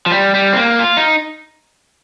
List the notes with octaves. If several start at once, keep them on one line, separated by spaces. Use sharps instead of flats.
F3
G3
G3
C4
A#3
F4
D#4